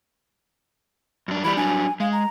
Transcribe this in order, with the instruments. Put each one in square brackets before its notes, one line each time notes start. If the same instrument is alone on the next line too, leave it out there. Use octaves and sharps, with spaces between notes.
[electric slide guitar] F#2 D4
[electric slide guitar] E3 G3 D5 [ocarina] B5
[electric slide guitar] F#3 G3 D4 [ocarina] G#5
[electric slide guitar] G#3 [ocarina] F5
[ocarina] A#5